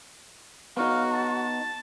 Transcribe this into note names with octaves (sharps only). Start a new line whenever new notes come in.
B3 D#4 F#4 F5
A5